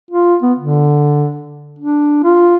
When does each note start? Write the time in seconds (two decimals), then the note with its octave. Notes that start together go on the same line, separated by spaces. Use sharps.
0.11 F4
0.42 B3
0.59 D3
1.79 D4
2.24 F4